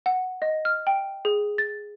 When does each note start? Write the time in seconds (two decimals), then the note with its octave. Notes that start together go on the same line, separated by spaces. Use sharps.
0.06 F#5
0.42 D#5
0.65 F6
0.87 G5
1.25 G#4
1.58 A6